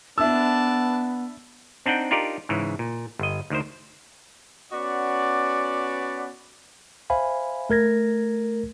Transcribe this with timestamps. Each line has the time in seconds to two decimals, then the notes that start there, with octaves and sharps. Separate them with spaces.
0.18 B3 D4 E5 A5 E6
1.86 C4 D4 D#4 F#5 G5
2.11 D4 D#4 F4 G4 A#4 D5
2.49 G#2 C#3 E3
2.79 A#2
3.19 G1 D#5
3.50 D2 D#3 C5
4.72 B3 C#4 F#4 D5
7.10 C5 E5 F5 G#5 B5
7.70 A3 A#4 G#6 A#6